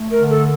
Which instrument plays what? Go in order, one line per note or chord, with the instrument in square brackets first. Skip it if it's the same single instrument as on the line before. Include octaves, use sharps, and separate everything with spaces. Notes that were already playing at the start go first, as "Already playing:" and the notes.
Already playing: [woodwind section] A3
[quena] A#4
[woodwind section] D3
[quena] A4